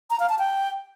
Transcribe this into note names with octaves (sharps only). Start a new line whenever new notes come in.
A#5
F5
A5
G5